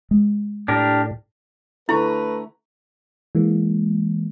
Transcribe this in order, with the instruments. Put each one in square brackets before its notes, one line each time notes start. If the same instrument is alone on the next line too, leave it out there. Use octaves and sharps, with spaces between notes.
[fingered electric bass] G#3
[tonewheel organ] A2 [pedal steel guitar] D4 G4 A#4
[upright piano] D3 A#5 C#6 [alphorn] A3 [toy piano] E4 [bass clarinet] B4
[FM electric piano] E3 G#3 A#3